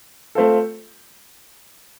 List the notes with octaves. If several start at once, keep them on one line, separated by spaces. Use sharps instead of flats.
A3 C4 F4 A4